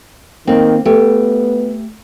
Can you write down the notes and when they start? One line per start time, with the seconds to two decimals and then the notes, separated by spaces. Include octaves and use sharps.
0.47 D#3 A#3 C4
0.85 A3 B3 G4